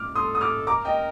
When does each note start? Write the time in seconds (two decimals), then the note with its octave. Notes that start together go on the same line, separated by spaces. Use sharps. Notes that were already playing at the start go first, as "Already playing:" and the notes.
Already playing: D6 F6
0.15 A4 C6 D#6
0.35 D#6
0.41 D6 F6
0.67 A#4 A#5 D6
0.85 D#5 G5